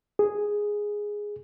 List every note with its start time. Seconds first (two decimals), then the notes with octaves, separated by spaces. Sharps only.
0.19 G#4